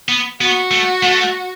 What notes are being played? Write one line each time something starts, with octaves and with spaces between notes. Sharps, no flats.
B3
B3 F#4
A3
A3